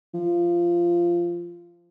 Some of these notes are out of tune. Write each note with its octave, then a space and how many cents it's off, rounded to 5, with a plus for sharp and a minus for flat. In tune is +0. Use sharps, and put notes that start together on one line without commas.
F3 -15